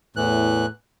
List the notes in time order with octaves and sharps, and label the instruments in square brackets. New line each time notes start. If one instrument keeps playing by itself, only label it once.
[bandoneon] E2 E3 F#6 [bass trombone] A2